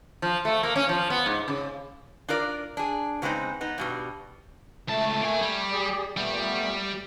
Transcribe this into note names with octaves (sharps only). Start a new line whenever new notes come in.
F3
A3
A#3
C#4
F3
B3
G#2
C#3
D4 F4 A#4 D5
D4 G#4
C#3 F#3 G#3 B3 C4 D#4
B3 D#4
G2 B2 G3
C#2 A3 A5
A#3 G#5
G3
G4 G#4 D5
A#2 G3 A3 B3